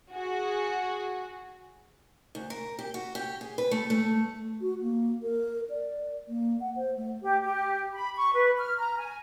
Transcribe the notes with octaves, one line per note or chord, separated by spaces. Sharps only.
F#4 G#4
D2
A#4
G4
F#4
G4
G#4
B4
A3
A3
F#4
A#3
A#4
D5
A#3
F#5
C5
A3
G4
G4
B5
C#6
B4
F6
A#5
G#5